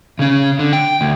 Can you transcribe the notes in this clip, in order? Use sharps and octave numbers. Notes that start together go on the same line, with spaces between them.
C#3 C#4
D3
G5
D2